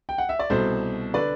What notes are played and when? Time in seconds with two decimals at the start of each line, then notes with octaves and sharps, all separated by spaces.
0.09 G5
0.18 F#5
0.29 E5
0.39 D5
0.50 C2 B2 A4 C5
1.14 D3 B4 D5